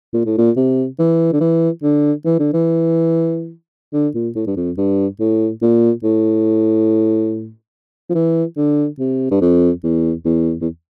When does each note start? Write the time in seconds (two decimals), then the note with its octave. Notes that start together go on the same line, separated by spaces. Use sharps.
0.14 A#2
0.25 A2
0.38 A#2
0.56 C3
0.99 E3
1.33 D3
1.40 E3
1.83 D3
2.25 E3
2.39 D3
2.53 E3
3.93 D3
4.14 A#2
4.35 A2
4.47 G2
4.56 F2
4.77 G2
5.20 A2
5.62 A#2
6.03 A2
8.09 F3
8.14 E3
8.57 D3
8.99 C3
9.31 G2
9.41 F2
9.84 E2
10.25 E2
10.61 E2